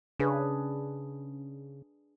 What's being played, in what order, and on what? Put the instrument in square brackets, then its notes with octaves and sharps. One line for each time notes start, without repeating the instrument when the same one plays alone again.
[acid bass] C#3 [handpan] D4 G#4 B4